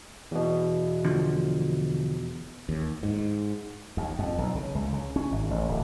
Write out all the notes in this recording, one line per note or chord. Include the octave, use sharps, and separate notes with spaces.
E2 B2
D2 D3 F3
D#2
G#2
D#2
F2
B1
C#3
C#2
C#3
C#4
G#1
A1
D1